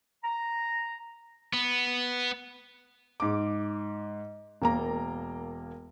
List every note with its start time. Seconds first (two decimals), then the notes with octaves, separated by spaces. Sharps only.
0.23 A#5
1.53 B3
3.20 G#2 D6
4.62 E1 A#3 A#5